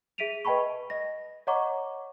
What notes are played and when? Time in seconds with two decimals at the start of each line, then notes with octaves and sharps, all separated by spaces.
0.18 G#4 E5 B6 D7 D#7 F7
0.45 B4 D#5 G5 A5 B5 C#6
0.90 D#5 A#6
1.47 C#5 D#5 F#5 A#5 C#6 D6